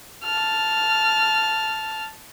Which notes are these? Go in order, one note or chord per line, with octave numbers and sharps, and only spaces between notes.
A5 F6